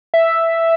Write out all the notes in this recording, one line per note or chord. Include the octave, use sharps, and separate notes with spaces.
E5